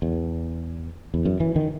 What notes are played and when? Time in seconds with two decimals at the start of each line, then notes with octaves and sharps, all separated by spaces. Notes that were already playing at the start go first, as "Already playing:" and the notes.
0.02 E2
1.14 E2
1.25 F#2
1.40 E3
1.56 D#3